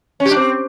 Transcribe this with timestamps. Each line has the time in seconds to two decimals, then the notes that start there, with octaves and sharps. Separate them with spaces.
0.20 C#4
0.26 G4
0.31 D4
0.37 C4